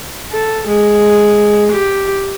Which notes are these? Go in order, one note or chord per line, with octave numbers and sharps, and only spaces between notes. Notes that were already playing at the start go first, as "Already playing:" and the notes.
A4
G#3
G4